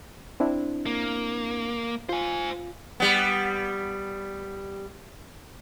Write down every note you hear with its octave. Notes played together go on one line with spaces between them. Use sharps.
C4 D4 E4
A#3
F4 C5 G#5
G3 B3